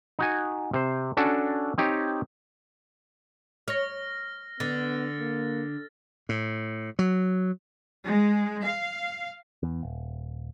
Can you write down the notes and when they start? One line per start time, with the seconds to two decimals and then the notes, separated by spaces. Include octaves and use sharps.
0.19 D#4 F#4 G#5
0.73 C3 C5
1.17 C#4 D4 F#4 A4
1.78 C4 D#4 G4 C#5
3.68 C#5 F6 A#6
4.60 D3 B3 A6
5.19 A#3
6.29 A2
6.99 F#3
8.06 G#3
8.63 F5
9.63 E2
9.83 D#1